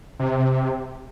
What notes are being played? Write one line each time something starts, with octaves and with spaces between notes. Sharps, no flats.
C3